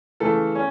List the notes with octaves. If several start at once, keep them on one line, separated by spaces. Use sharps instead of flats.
C#3 E3 A3 A4
C#4